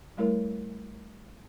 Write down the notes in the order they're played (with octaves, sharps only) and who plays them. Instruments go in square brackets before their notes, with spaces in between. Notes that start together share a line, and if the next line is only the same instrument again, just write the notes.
[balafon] G3 A3 E4 A#4 C#5